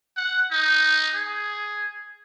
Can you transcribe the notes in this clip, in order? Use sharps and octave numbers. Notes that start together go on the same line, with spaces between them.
F#5
D#4
G#4